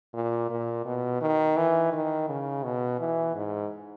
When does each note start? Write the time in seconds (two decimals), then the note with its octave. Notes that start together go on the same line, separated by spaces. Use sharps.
0.14 A#2
0.50 A#2
0.86 B2
1.21 D#3
1.57 E3
1.93 D#3
2.29 C#3
2.64 B2
3.00 E3
3.35 G#2